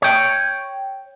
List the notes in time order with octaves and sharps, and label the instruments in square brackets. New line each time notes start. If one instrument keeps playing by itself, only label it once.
[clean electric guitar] C#5 G5